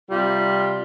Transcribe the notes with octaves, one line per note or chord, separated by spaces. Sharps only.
C3 G3 F4